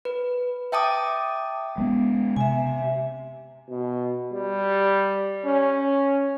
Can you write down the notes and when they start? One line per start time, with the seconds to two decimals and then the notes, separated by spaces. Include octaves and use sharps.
0.05 B4
0.72 E5 G5 A5 D6 D#6
1.78 G#3 A#3 B3
2.36 C3 E5 G#5
3.70 B2
4.33 G3
5.45 C#4